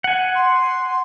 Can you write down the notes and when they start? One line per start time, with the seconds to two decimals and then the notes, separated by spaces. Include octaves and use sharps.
0.04 F#5 G#5
0.35 C6